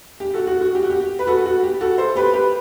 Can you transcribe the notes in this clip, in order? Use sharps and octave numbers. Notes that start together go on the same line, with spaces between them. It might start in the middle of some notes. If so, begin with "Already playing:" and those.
G4
F#4 A4
F#4
F#4
G4
F#4
G4
B4
F#4 A4
F#4
G4
F#4 A4
A4 C5
G4 B4
G4 B4